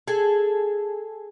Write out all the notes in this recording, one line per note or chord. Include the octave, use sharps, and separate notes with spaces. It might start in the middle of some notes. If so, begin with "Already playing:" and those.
G#4 A4